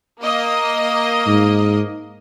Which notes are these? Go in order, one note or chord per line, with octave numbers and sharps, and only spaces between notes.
A#3 D#5
G#2